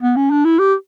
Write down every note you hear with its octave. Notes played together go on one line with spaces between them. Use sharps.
B3
C#4
D4
E4
G4